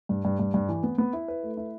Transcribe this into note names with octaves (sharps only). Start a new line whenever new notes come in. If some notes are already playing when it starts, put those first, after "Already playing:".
G2
G2
G2
G2
E3
B3
B3
E4
B4
A3
E4